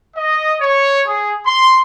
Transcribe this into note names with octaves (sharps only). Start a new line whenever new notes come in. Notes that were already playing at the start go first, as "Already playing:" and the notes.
D#5
C#5
G#4
C6